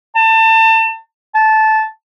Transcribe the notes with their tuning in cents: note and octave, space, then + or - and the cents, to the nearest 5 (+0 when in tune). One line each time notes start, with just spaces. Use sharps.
A5 +30
A5 -15